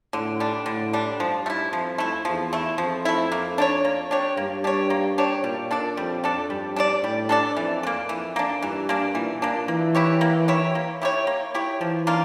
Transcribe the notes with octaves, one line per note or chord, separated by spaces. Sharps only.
A2 D3
G3 D4
A2 D3
G3 D4
G2 F3
A3
E4
F2 F3
A3 E4
E2 F3
A3 E4
F2 F3
A3 E4
A#3
D4 G4 C#5
A#3
D4 G4 C#5
G2 A#3
D4 G4 C#5
A#3
D4 G4 C#5
A#2 G3
D4 A4 D5
F2 G3
D4 A4 D5
G2 G3
D4 A4 D5
A2 G3
D4 A4 D5
F2 E3
D4
A#3
F2 E3
A#3 D4
G2 E3
A#3 D4
A#2 E3
A#3 D4
E3 A#3
E4 G4 C#5
A#3
E4 G4 C#5
A#3
E4 G4 C#5
A#3
E4 G4 C#5
E3 F3
A#3 D4 F4